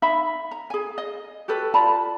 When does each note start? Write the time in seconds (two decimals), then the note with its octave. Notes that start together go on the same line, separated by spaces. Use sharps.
0.02 D#4 E5 B5
0.51 A#5
0.70 G#4 G#5
0.98 D#5
1.48 F#4 G4 A4 B4
1.74 F4 D5 A5 B5